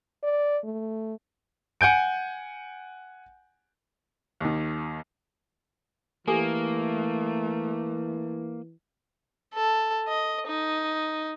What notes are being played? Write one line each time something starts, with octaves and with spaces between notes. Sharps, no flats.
D5
A3
F#5 G#5 G6 D7
D#2 D#3
E3 A3 A#3 G4 A4 G#5
A4
D#5
D#4